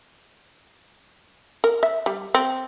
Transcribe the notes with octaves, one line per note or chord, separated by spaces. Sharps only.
A#4
E5
G3
C4